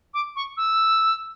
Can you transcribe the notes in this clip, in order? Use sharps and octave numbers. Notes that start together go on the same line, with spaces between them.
D6
C#6
E6